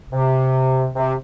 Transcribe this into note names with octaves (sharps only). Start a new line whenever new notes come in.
C3
C3